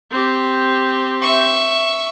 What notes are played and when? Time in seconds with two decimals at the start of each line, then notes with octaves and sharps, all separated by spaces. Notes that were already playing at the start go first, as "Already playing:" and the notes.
0.11 C4 G4
1.22 E5 C#6